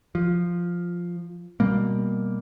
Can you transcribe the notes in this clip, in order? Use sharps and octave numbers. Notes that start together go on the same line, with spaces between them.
F3
B2 G3 A#3